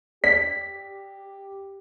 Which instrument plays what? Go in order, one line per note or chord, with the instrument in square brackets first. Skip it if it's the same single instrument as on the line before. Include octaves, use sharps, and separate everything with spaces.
[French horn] G4 [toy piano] D5 [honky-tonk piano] B6